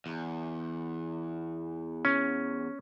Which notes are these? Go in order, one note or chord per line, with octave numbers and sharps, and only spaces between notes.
E2
C#4